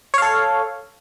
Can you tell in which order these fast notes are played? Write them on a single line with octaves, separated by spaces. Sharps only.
C#5 F5 A4